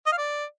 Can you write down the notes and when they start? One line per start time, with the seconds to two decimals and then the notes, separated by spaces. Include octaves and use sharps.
0.06 D#5
0.12 F5
0.18 D5